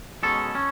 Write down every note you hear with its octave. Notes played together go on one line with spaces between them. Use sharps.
B2 G#3 C#4 A4
C#4